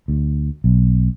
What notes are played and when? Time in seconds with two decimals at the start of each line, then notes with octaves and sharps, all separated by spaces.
0.08 D2
0.64 B1